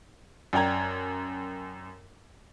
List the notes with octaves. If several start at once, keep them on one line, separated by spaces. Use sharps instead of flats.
F#2 D5 G5 A#5 G#6